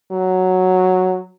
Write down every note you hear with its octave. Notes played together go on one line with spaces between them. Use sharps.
F#3